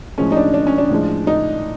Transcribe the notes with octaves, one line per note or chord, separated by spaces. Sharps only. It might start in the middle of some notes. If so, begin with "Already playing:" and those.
A2 F3 G#3 C#4
D#4
D4
D4
C#4
D4
A2 F3 G#3
D#4